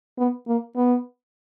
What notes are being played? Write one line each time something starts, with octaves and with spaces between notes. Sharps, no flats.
B3
A#3
B3